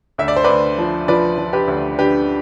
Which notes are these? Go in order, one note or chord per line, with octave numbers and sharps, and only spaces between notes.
D2 E5
D5
C5
D2 B4 D5
F3
F3 B4 D5
F3
G4 B4
D2
D3 G4 B4